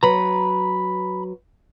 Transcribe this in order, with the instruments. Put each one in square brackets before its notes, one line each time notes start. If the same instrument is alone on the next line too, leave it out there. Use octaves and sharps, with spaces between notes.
[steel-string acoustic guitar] F#3 B4 [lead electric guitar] A#5 B5